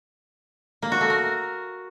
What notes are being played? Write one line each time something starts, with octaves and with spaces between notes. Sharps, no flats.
A#3
F#4
A3
A#4